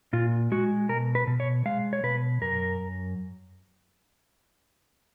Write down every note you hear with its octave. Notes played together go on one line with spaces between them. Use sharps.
A#2 F4
G#3 F#4
B2 A#4
B4
B2
C#5
G#3 F5
C#5
B2 B4
F#2 A#4